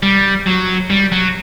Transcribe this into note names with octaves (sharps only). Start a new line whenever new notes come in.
G3
F#3
G3
F#3